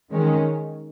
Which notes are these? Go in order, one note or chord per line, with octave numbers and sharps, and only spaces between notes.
D#3 G#3 C#4